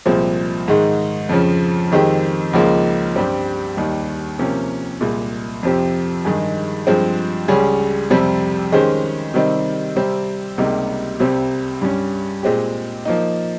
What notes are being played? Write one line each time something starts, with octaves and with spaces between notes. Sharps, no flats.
C2 A#2 F3 G#3 C4
G#2 D#3 G#3
F2 C#3 F3
F2 D#3 G#3 C4 G4
C#2 C#3 F3 A#3 D#4
G2 G3 C4 G4
D#2 D#3 G3
C3 F3 A#3 C#4 G4
C2 A#2 G#3
F2 C3 F3 C4 G4
G2 D#3 G#3 D#4 G#4
G2 F3 G#3 C4
C#2 C#3 G3 C#4 G#4
F2 C3 G3 C4 G4
D#3 G#3 C#4 G4 C5
C3 D#3 G3 C4 D#4
C3 G3 C4
C#2 C3 G3 A#3 D#4
C2 C3 G3 C4 G4
G2 G3 C#4
A#2 G#3 C4 G4
F3 A#3 D#4